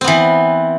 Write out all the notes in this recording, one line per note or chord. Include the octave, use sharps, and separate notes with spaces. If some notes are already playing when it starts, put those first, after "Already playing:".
E3 B3 C4